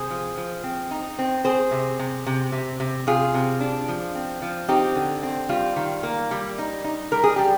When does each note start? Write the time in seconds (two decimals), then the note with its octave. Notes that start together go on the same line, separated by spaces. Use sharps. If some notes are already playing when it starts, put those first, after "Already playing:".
Already playing: C3 G#4 C5
0.11 F3
0.37 F3
0.64 C4
0.91 D#4
1.19 C4
1.44 C4 G#4 C5
1.71 C3
1.99 C3
2.27 C3
2.52 C3
2.80 C3
3.07 C3 F4 G#4
3.34 C3
3.60 D4
3.88 F3
4.15 C4
4.42 F3
4.68 C4 D#4 G4
4.95 D3
5.23 C4
5.49 G3 F4
5.76 D#3
6.03 A#3
6.31 G3
6.58 D#4
6.84 D#4
7.12 G3 A#4
7.24 G#4
7.36 G3 G4